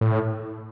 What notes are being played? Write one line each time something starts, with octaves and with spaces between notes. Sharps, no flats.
A2